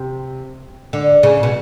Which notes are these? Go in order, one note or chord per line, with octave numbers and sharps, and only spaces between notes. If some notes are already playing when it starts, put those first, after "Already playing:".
Already playing: C3
D3
C#3
B2